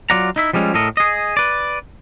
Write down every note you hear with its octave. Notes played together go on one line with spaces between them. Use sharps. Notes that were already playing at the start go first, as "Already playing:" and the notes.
F#3 F4 D5 F#5 A#5
D#4 E4 E5
F3 G3 G#3 C#4
A2 A4 A#4 D#5
G#4 D#5
B4 D5